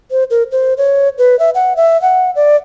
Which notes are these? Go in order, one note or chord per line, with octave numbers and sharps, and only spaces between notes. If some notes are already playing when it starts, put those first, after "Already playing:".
C5
A#4
C5
C#5
B4
E5
F#5
E5
F#5
D5